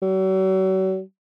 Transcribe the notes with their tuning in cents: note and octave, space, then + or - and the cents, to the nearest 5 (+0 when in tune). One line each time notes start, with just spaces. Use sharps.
F#3 +40